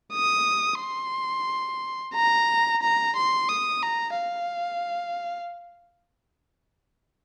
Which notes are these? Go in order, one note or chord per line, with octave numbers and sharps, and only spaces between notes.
D#6
C6
A#5
A#5
C6
D#6
A#5
F5